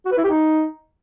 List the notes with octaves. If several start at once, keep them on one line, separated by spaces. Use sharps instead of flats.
F#4
B4
E4
G4
D#4